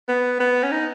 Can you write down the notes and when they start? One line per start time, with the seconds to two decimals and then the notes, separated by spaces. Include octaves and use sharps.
0.09 B3
0.40 B3
0.63 C#4
0.71 D#4